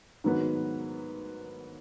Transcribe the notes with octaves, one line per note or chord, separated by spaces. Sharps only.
G#2 D#3 F#3 B3